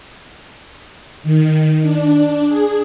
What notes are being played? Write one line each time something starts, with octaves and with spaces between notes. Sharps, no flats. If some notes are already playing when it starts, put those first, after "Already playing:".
D#3
D4
G#4